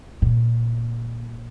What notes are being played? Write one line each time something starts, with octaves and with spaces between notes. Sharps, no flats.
A#2